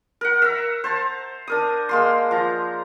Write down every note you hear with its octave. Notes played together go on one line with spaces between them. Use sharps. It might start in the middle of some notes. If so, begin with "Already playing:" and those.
A#4 F#5
E5 A#5
C5 A5 A#5
D4 A#4 D#6
G#3 A#3 C6
F3 A#5